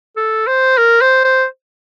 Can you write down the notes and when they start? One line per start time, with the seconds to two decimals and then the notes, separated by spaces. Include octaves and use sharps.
0.16 A4
0.47 C5
0.78 A#4
1.01 C5
1.24 C5